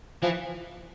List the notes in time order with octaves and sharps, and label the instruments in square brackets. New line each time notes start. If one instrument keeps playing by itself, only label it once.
[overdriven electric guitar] E3 [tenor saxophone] F3